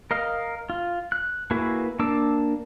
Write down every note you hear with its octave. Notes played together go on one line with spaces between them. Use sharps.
A#4 D#5 F5
F4
F#6
A#3 E4 F#4 G#4 B4
A#3 D4 A5 D6 E6